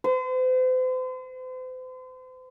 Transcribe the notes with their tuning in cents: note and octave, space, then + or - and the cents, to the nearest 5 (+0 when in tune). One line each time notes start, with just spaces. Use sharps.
C5 -40